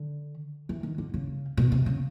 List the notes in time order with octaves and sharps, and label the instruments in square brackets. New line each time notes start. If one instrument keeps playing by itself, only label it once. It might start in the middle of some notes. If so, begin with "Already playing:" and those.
Already playing: [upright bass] D3
E3
D#3
D3
C#3
B2
C3
C#3